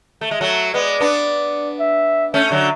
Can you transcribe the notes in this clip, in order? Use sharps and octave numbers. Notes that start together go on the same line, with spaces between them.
A3 E5
G#3
F#3 A3
G#3 B3 D5
B3 D4
E5
A3 C#4 E5
D3 F#3